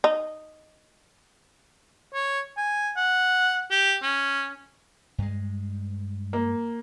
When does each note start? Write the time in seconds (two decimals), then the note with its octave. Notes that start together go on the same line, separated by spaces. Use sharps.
0.04 D#4
2.14 C#5
2.57 G#5
2.97 F#5
3.71 G4
4.02 C#4
5.18 G2 G#3
6.33 A#3